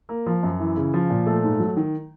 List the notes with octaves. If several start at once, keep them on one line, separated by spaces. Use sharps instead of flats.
A#3
F3
F#2
E3
C#3
F3
A#2
A3
G#2
F#3
D#3